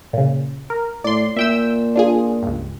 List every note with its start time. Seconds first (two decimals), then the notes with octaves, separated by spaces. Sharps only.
0.13 A#2 C#3
0.70 A#4
1.04 A2 D5 C6
1.37 A#2 E5 G5 E6
1.96 D4 F4 G#4
2.43 C#2 G2